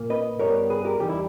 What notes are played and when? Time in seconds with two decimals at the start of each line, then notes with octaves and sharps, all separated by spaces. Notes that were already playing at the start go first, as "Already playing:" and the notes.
Already playing: A#2 A#3
0.10 B4 D#5
0.39 G2 G3 B3 A#4 C#5
0.70 G#4 B4
0.85 G4 A#4
1.00 E2 D#3 G3 G4
1.09 E4